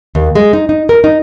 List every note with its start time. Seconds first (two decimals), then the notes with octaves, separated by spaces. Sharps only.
0.15 D#2
0.35 G#3
0.53 D#4
0.69 D#4
0.89 A#4
1.04 D#4